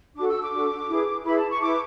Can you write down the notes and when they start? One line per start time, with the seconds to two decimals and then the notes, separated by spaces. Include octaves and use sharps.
0.16 D4 F#4 A4 D6
0.28 E6
0.41 D6
0.52 D4 F#4 A4
0.89 E4 G#4 B4
1.24 E4 G#4 B4 B5
1.37 A5
1.49 C#6
1.61 E4 D6
1.66 B4